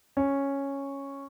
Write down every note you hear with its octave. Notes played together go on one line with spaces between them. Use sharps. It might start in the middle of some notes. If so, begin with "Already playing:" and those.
C#4